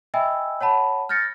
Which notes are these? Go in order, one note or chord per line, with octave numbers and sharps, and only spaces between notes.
D#5 E5 G5 G#5 B5 E6
C#5 F#5 A5 B5
F6 G6 A6 A#6 C#7